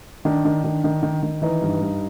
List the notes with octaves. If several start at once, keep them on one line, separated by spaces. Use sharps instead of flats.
D#3 D4
D#3
D#3
D#3
D#3
D#3
E3 D#4
G2
G2